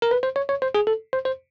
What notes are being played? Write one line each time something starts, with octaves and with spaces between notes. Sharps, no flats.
A#4
B4
C5
C#5
C#5
C5
G#4
A4
C5
C5